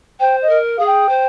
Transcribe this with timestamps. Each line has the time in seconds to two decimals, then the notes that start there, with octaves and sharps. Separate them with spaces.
0.20 C5 G5
0.41 D#5
0.49 A#4
0.77 G#4 F5
0.86 G5
1.09 C5